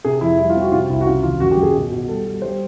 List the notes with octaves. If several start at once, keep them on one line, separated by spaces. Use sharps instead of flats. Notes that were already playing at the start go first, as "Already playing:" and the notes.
C3 G#4
F2 E4
G3 E4
F4
C4
F#4
C3 F4
C2 E4
F#4
C#3 F4
D#2 F4
F#2 F#4
G4
F#2
G#4
B2
B2
G3 A4
G3
G3 C5